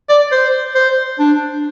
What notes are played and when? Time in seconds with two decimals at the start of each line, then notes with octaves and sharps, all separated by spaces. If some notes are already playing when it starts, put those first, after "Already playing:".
0.09 D5
0.32 C5
0.75 C5
1.19 D4